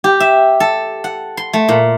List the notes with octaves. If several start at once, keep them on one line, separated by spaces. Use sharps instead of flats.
G4
E5
A4
F#5
C6
A3
A#2